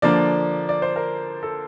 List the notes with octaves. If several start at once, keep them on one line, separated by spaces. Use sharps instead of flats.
D3 F3 A#3 D4 D5
D5
C5
A#4
A4